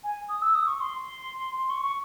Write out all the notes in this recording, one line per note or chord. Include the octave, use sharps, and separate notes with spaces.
G#5
D#6
E6
D#6
C#6
C6
C6
C#6
C#6